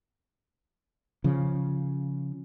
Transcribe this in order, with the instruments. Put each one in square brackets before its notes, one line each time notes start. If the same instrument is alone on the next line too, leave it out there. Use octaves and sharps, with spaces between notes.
[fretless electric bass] C#3 F3